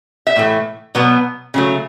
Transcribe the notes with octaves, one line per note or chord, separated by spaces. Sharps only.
E5
A2 E3 A3
B2 F#3 B3
C#3 F#3 A3